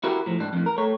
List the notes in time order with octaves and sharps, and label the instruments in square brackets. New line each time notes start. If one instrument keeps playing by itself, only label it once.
[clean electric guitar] E4 F#4 G4 A#4
A2 F3
G#2 D4
F2 A2
A#4
A3 C#5